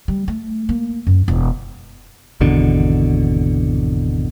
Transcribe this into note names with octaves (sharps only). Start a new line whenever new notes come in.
G3
A3
A#3
F#2
E1
G#1 E2 B2 D3